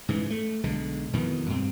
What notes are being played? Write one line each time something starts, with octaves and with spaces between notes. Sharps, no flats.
G#2 C#3 E3
A3
B1 D3 G#3
F2 B2 D#3 E3
G2 C4